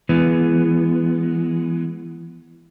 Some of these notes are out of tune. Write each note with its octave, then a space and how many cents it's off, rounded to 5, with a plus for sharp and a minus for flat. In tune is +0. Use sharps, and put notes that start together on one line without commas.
E3 +25 G#3 +0 B3 +0